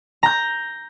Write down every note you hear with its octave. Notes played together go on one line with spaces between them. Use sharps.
A#5 G6